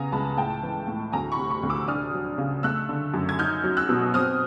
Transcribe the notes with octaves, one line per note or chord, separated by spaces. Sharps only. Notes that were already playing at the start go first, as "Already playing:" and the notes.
Already playing: C#3 B3 G#5 A#5
C#2 A5 B5
A2 G5 A5
E3
A2
D2 G#5 A#5
B5 C#6
C3
B5 C#6
D2
D6 E6
D4 D#6 F6
F#3
C#3
A3 E6 F#6
D3
F#2
G#6
D#4 F6 G6
F#3
E6 F#6
B2
C4 D#6 F6